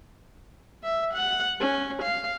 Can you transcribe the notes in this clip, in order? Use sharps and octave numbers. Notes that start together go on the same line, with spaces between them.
E5
F#5
C#4
F5